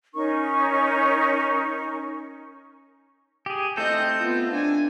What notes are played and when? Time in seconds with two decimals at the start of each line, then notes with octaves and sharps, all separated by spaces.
0.15 C#4 D#4 A#4 C#6
3.46 G4 G#4
3.77 A3 C4 A4 D#5 G6
4.20 B3 F4
4.52 D4 G#5